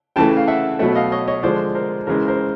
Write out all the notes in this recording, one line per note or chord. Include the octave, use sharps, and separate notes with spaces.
C#3 E3 A3 G5 A5
F5
E5 F#5
B2 F#3 A3 E5 F#5
D#5 F5
C#5 D#5
C#5 D#5
D3 F3 G#3 C5 D5
A#4 C5
C#3 E3 G#3 A#4 C5
A#4 C5